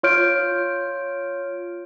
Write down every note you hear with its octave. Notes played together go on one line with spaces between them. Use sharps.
F4 C#5 F6 G6 D7